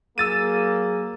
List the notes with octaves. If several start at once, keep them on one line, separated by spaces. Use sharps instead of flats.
F#3 A#3 G#4 E6 A6 D#7